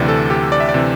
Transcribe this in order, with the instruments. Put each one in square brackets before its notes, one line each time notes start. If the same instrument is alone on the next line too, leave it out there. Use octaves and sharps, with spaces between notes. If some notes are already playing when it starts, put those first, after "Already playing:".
Already playing: [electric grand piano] D2 C3 E3 D5
A4
G4
D5
E5
D5
C3 E3